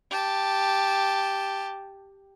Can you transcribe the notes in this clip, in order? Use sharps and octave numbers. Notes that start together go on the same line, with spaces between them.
G4 A5